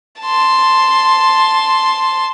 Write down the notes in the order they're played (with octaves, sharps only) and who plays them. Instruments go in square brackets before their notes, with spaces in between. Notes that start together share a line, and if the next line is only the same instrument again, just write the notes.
[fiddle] A5 C6